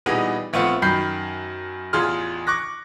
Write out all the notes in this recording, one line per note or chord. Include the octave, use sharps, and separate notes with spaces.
A#2 E3 G3 B3 D#4 G#4
A#1 A3 B3 C4 F4 C#7
F#2 D#3 B5 G6 C7
A1 E2 F4 G#4 C6 F6
C#6 D6 F#6 A#6